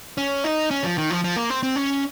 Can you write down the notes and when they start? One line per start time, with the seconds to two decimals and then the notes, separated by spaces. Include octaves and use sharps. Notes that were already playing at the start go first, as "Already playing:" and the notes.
0.18 C#4
0.44 D#4
0.71 C#4
0.84 F3
0.98 D#3
1.10 F3
1.24 F3
1.36 A#3
1.50 C4
1.63 C4
1.76 C#4